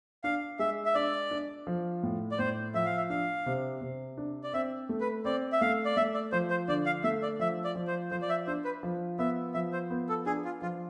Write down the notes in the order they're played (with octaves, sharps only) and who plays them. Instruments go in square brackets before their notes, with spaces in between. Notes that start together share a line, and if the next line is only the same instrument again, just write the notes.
[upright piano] D4 [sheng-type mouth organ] F5
[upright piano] G#3 [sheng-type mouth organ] E5
[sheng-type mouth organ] E5
[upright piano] D4 [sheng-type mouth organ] D5
[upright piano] D4
F3
A2
[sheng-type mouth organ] D5
[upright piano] A2 [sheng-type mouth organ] C5
[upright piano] F3 [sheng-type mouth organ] E5
[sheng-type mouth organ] F5
E5
[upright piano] D4 [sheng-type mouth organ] F5
[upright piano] C3
C3
D4
[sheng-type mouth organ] D5
[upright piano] C4 [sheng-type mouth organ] E5
[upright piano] A3
[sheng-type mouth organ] B4
[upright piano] C4 [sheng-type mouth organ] D5
[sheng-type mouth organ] E5
[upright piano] A3 [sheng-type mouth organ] F5
[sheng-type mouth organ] D5
[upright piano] A3 [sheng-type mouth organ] E5
[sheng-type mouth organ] D5
[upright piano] F3 [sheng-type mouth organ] C5
[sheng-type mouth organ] C5
[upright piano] D3 [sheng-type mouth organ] D5
[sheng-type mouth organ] F5
[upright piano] A3 [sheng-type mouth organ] E5
[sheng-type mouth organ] D5
[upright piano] F3 [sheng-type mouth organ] E5
[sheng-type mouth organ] D5
[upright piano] F3
[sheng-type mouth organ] C5
[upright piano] F3 [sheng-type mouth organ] C5
[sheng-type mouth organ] D5
E5
[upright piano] D4 [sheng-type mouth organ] C5
[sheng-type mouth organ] B4
[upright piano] F3
[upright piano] B3 [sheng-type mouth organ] E5
[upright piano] F3 [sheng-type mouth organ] E5
[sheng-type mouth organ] C5
[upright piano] B3
[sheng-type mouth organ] A4
[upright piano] D4 [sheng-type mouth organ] G#4
[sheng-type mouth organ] F4
[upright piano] F3 [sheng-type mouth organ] F4